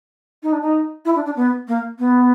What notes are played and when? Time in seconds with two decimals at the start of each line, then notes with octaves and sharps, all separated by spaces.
0.43 D#4
0.53 D4
0.61 D#4
1.05 E4
1.16 D4
1.26 D4
1.36 B3
1.68 A#3
1.99 B3